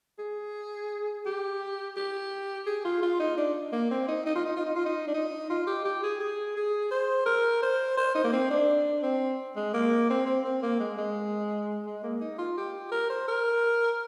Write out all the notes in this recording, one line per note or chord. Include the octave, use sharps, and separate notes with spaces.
G#4
G4
G4
G#4
F4
F4
D#4
D4
A#3
C4
D#4
D#4
F4
D#4
F4
D#4
F4
D#4
D4
D#4
F4
G4
G4
G#4
G#4
G#4
C5
A#4
C5
C5
D#4
A#3
C4
D4
C4
G#3
A#3
C4
C4
C4
A#3
G#3
G#3
G#3
A#3
D#4
F4
G4
A#4
C5
A#4